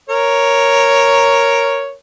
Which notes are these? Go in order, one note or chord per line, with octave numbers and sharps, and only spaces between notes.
A#4 C#5